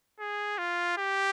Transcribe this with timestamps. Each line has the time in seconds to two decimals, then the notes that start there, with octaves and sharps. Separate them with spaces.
0.20 G#4
0.58 F4
0.98 G4